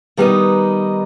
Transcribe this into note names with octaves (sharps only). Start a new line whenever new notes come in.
D#3 G3 B3 D#4